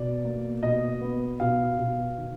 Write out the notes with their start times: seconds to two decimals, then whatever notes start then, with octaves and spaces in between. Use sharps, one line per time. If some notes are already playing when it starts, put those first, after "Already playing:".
Already playing: B2 D5
0.25 A#3
0.63 B2 D#5
1.01 B3
1.40 B2 F5
1.79 B2
2.18 D#3